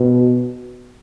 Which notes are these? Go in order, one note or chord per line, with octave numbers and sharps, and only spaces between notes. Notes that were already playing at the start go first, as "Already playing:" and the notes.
Already playing: B2